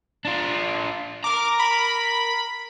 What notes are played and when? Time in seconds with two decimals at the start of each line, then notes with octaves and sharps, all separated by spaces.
0.25 D4 F4
1.24 A#4 A#5 D6
1.60 B5